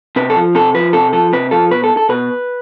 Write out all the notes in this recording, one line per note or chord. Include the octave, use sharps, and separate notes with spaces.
C3 B4
A4
F3
C3 A4
F3 B4
C3 A4
F3 A4
C3 B4
F3 A4
B2 B4
A4
A4
B2 B4